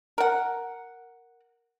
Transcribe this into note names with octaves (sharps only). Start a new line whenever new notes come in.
A#4 F#5